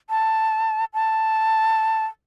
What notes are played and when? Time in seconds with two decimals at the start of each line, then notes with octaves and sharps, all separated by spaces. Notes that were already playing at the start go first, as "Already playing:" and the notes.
0.10 A5
0.94 A5